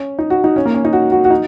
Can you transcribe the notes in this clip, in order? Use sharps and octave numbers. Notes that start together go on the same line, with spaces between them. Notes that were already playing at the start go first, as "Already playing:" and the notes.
Already playing: C#4
D#4
F#4
D#4
C#4
A#3
C#4
D#4
F#4
F#4
F#4
D#4